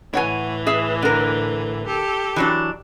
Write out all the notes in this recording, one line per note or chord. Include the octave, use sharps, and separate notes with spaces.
A2 E3 C#5 F#5 G#5
G#4 E5
D3 A#4
G4 A4
E3 F#3 D4